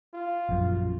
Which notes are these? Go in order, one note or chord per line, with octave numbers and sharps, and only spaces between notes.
F4
A#1 F#2